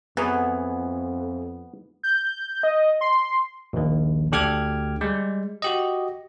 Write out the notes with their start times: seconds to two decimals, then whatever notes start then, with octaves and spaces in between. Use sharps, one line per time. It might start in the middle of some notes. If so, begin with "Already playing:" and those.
0.17 F2 E3 F#3 B3 G#4
2.03 G6
2.63 D#5
3.01 C6
3.73 A#1 D#2
4.32 D2 D3 G4 D6 F6 G#6
5.01 G3 G#3
5.62 F#4 G4 D#5